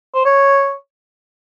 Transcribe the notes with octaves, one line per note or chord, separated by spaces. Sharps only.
C5
C#5